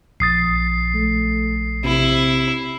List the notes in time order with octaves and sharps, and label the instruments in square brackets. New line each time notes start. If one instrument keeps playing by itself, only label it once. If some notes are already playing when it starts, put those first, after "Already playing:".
[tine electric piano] A#1 D#6 A6 [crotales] C7
[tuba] A3
[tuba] C3 [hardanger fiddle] E4